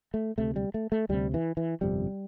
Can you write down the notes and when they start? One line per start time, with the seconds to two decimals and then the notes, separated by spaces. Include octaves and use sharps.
0.14 A3
0.38 D2 C3 A3
0.56 G3
0.74 A3
0.92 A3
1.09 D2 C3 G3
1.34 E3
1.57 E3
1.81 G1 F2 C3 G3